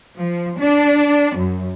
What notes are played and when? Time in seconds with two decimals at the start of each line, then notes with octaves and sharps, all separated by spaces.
0.16 F3
0.60 D4
1.36 F#2